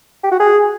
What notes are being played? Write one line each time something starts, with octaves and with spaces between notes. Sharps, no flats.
G4
F#4
G#4